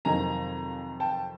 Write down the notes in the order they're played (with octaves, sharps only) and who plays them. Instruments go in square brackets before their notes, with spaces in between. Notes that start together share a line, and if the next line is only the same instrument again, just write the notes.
[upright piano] F2 C3 D#3 F#3 G#5 A#5
G5 A5